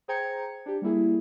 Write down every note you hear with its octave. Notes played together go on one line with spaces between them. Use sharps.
G#4 C5 G5 A#5 G#6 C#7
D4 G4
G3 A#3 E4 G#4